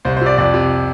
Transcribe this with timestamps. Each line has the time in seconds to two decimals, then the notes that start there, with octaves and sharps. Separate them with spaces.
0.05 C2 C5
0.17 C5
0.21 C3 D5
0.38 F2 D5
0.54 C3